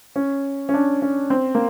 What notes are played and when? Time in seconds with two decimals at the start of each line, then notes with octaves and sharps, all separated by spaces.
0.16 C#4
0.69 C#4
0.74 D4
1.02 C#4
1.30 C4
1.55 A#3